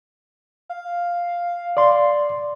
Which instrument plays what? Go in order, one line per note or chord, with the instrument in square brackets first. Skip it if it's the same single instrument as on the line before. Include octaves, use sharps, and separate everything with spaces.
[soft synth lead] F5
[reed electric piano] D5 C6